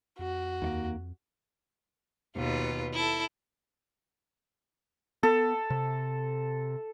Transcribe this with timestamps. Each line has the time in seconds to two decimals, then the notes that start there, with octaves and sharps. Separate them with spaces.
0.19 F2 F#4
0.62 D#2 A3 A#3
2.35 D#2 B2 F4 B4
2.94 E4 A4
5.23 B3 A4
5.70 C3